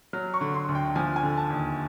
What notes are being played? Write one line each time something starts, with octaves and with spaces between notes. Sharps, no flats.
F#3 F6
C#6
D3
C6
D2
G5
F3 G#5
G#5
D3
A5
D#2